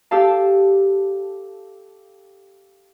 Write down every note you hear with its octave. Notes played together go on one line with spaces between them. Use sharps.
G4 A4 F5 A5